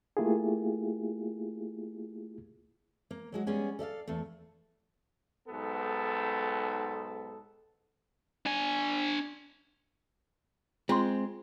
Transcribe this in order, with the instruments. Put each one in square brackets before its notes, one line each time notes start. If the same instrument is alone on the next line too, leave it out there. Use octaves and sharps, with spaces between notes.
[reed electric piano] A3 A#3 E4 F4 G4 G#4
[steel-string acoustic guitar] A#3
F#3 G#3 F#4
G3 G#3 B3 C#4 G#4
A4 D5 E5 F5
E2 A3
[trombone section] B1 G#2 B3 A4
[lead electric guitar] D4 G#5
[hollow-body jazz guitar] G#3 C4 [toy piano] F4 C6